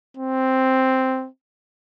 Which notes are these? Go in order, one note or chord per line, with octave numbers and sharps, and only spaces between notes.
C4